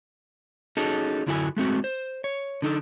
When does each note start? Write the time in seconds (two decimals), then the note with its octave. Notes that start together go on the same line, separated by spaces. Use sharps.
0.77 C#4 D#4 F#4 G#4 A4
1.27 F#2 D3 E4 F#4 A4 G#5
1.57 G#3 A3 C4 F#4
1.84 C5
2.24 C#5
2.62 D3 D#4 A4